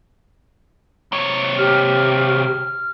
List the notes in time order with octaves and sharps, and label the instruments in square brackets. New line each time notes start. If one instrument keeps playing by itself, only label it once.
[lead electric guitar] C3 C#5
[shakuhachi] G4 [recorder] F6